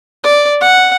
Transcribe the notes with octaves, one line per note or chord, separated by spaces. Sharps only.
D5
F#5